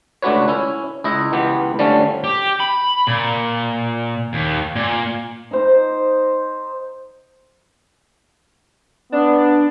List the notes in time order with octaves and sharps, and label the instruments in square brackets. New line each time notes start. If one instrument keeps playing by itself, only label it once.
[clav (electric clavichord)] C#2 A3 D4 F#4 B4 C#5
C#4 E4
C#2 E4 D#5
C#2 E3 B3 G4
D3 F3 G3 A3 C#4
[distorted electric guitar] G4
B5
A#2
D#2
A#2
[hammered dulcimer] D#4 C5
[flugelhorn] B3 [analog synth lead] D4